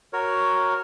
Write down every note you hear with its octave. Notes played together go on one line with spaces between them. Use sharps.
F#4 A#4 C#5